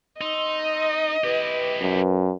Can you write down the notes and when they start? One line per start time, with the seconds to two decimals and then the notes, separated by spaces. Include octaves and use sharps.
0.21 D#4 D#5 C6 E6
1.24 E4 G4 B4
1.82 F#2